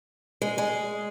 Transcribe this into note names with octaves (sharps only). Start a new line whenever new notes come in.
G#3
G#3